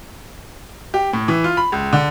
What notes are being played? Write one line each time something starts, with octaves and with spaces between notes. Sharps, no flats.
G4
A2
E3
F4
B5
C#2
D3